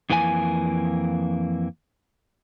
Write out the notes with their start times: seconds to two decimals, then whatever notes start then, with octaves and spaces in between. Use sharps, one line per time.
0.10 F2 E3 A#3 D4 G#5